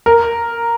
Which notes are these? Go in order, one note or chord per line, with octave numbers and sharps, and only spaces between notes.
A#4